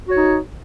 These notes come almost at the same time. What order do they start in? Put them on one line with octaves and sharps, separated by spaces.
F#4 C#5 D#4